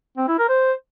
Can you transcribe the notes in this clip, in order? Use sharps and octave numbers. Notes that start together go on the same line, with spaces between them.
C4
E4
A#4
C5